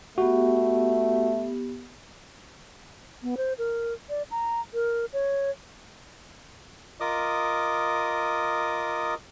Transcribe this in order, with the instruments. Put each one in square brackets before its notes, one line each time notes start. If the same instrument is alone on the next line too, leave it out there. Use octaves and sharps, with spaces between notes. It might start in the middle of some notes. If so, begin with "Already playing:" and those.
[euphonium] A3 [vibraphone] B3 G4 [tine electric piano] F#4
[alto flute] B3
C5
A#4
D5
A#5
A#4
C#5
[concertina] F4 A#4 D#5 D6 D#6